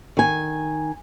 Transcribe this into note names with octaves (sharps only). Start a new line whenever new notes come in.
D#3 G#5